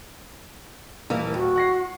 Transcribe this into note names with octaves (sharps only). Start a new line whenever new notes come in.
D#1 E3 A#3
D#2 F#4
F#5 A#6 C7